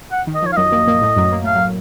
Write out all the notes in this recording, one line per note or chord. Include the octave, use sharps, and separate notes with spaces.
F#5
D#3
D#5
F3 C#5
F5
F#2 F#3 D#5
A#2 A#3
A#2 A#3
A2 A3
F#2 F#3
A#3
A3 F5
F#3